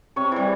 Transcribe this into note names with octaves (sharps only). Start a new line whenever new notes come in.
C3 C#5 C#6
E3 G3